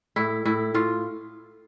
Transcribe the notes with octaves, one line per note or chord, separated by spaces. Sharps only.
A2 E4
A2 E4
A2 F4